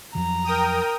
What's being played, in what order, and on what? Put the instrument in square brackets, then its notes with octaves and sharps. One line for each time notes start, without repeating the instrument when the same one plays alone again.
[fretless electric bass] F2 F3 F#3 [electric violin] A#5
[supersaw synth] A#4 G5 D#6